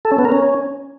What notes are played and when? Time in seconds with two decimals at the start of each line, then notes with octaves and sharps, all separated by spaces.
0.05 A4
0.12 C#4
0.18 B3
0.25 A#4
0.32 C#4